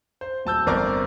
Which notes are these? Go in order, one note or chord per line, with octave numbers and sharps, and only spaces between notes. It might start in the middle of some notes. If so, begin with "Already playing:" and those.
C5
D1 A5 E6 G6
G1 C4 A#4 D5 C#6 D6